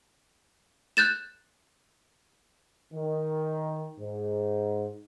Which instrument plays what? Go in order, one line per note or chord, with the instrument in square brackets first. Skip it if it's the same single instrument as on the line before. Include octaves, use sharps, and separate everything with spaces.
[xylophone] F#6 G6 A6 E7
[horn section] D#3
G#2